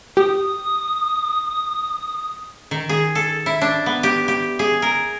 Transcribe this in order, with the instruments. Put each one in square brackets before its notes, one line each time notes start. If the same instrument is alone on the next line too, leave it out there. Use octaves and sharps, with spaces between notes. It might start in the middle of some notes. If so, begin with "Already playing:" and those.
[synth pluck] G4 [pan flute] D#6
[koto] D#3
G#4
A4
E4
D4
B3
G4
G4
G#4
A#4